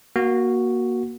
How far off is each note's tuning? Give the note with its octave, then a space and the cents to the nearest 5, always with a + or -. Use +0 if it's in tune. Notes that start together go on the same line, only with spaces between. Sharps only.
A#3 +25 F#4 +0